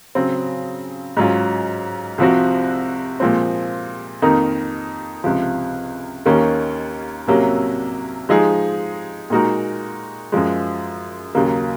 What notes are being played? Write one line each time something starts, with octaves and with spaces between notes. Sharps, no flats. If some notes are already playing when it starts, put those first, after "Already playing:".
C#3 F#3 C4
G#2 F#3 C#4 F4
C2 C3 F3 C4 F#4
A#2 F3 G#3 C4
F2 D#3 A#3 D#4 A#4
C#2 C3 F3
D#2 D#3 A#3 C#4
C2 C3 F#3 A#3 C#4
F3 G#3 D#4 G#4
A#2 G#3 D#4 F#4 A#4
F#2 F3 G#3
D#2 C#3 F#3 A#3